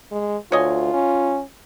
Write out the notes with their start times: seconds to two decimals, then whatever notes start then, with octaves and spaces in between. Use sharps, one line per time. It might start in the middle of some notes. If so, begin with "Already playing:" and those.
0.12 G#3
0.52 D2 F4 C#5 D#5 G#5
0.93 C#4